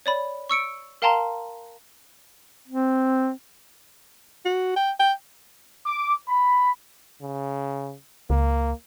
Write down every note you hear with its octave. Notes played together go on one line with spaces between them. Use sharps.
C#5 D5 B5
C#6 E6 C#7 D7
A#4 F5 G5 A5 A#5 C6
C4
F#4
G5
G5
D6
B5
C#3
C#2 A#3